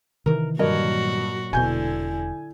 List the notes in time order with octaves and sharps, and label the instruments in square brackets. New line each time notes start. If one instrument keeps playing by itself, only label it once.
[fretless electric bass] C3 D#3 E3 [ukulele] A#4
[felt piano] G2 [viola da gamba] A#2 F#3 F#4 [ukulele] A#4 C#5 D#5
[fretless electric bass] E1 B2 [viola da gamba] D3 E4 [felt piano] G#5 G6